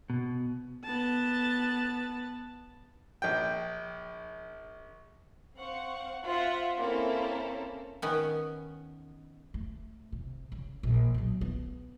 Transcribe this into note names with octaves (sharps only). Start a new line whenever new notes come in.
B2
B3 A5
A#1 G5
C4 F5 F#5 C#6
C4 F4 C5 E5 F#5
A#3 C4 C#4 E4 A4 F5
D#3 B3 C#4
A3
C3
C#3
A#1
B1 F#3
B3